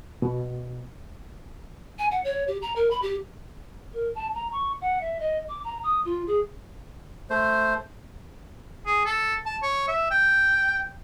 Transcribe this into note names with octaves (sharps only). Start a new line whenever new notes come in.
B2
G#5
F#5
C#5
G4
A#5
A#4
B5
G4
A#4
A5
A#5
C#6
F#5
E5
D#5
D6
A#5
D#6
F4
G#4
A3 C5
G#4
A4
A5
C#5
E5
G5